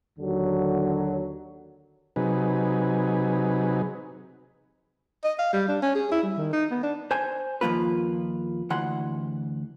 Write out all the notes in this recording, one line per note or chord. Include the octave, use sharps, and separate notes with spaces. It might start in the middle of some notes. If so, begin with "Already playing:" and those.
D#2 D3 F#3
C3 F#3 D#4 G#4 B4
D#5
F5
G3
D4
C#4
G#4
E4
G3
D#3
D#4
B3
D4
C5 G#5
D#2 B2 F3 A#3 F4 B4
D2 E3 F#5 C6